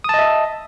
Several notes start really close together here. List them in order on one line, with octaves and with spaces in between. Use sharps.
D#6 A5 D#5 E5